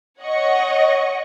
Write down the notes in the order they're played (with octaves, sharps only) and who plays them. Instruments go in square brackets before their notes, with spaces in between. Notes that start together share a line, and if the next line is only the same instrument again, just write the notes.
[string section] C#5 D#5 F#5 C#6